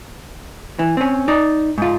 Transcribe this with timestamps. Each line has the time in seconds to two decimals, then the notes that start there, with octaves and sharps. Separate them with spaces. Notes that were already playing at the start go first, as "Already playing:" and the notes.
0.79 E3
0.97 C4 C#4
1.28 D#4 D5
1.78 G#2 F4